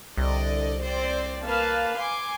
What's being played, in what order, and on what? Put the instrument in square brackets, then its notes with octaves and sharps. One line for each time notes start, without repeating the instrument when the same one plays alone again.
[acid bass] C2 [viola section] D3 D5 [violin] D#5
[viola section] C4 D5 [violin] C5
[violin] A#3 [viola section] B4 F5 A5
[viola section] G#5 [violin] C6 D6